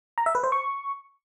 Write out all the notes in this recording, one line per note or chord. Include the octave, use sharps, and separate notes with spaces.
A#5
E5
B4
C5
C#6